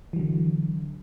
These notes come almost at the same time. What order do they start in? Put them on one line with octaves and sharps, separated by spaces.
E3 F#3 D3